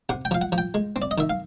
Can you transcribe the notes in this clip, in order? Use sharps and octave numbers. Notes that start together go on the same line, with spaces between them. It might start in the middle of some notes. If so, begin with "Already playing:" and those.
C3 F#5
G5
F3 F5
F#5
F3
G5
G#3
C4
D5
D#5
D#3 E5
F5